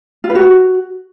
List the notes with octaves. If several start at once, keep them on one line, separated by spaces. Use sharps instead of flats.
F4
B4
F#4